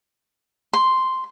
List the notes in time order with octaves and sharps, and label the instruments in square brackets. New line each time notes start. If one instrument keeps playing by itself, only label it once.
[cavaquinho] C6